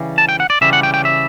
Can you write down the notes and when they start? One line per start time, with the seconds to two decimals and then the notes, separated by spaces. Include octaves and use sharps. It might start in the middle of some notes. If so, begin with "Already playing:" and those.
Already playing: C#3 E3 G3
0.18 A5
0.29 G5
0.40 F#5
0.50 D5
0.61 C#3 E3 G3 C#4 E5
0.73 F#5
0.83 G5
0.94 G5
1.05 E5